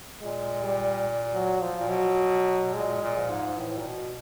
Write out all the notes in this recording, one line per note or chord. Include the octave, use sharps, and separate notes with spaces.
A#2 G#3
G3
F#3
F3
A#2
B2 F#3
A#2 G#3
A#2
F3
G#2
A2 E3
A2
A#2
B2